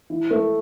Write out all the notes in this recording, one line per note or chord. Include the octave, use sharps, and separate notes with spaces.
E3
A3